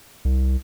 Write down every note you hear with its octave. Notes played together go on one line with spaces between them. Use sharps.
C2